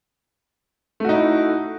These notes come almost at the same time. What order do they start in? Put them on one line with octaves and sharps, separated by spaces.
A3 F#4 D#4 E4